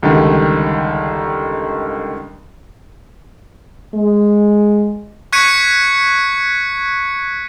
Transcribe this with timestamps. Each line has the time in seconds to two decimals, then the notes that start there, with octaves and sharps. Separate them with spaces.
0.03 C#2 D3 D#3 G3
3.94 G#3
5.32 C#6 F#6 G#6 B6 C#7 D#7